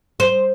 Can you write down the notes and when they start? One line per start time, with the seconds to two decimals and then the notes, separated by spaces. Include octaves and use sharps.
0.20 C5